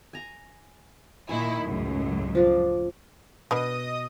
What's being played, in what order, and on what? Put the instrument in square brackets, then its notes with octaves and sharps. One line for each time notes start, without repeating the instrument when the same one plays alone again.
[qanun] G#5 A#5
[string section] A#2 D#3 E4 [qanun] G#5
[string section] C#2 F#2 A2
[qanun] F3 D4
[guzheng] B2 [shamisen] B3 D4 B4 [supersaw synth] D#5 D#6